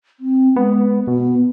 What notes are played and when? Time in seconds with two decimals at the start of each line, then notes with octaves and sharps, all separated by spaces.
0.20 C4
0.56 G#3 B3
1.07 B2 B3